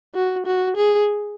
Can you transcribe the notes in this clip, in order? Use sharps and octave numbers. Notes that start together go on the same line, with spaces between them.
F#4
F#4
G#4